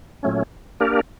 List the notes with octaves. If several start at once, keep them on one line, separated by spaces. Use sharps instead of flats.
A#2 F#3 A3 C#4
A#3 D4 G4 A#4